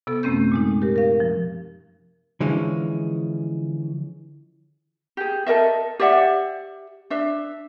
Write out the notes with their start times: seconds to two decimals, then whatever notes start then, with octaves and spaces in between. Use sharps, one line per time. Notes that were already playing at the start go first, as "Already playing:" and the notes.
0.07 C3 B3 A4
0.23 F#2 A3 C4 C#4 G6
0.52 A#2 G#3 D#4
0.82 G4 A#4
0.96 A#4 F5
1.20 F3
2.40 D3 E3 F3 G#3 C#4
5.17 G4 G#4
5.46 A4 A#4 D#5 E5
5.99 G4 D5 E5 F#5
7.10 D4 E5